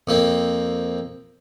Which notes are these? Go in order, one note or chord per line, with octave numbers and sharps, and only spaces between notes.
F2 A#3 C4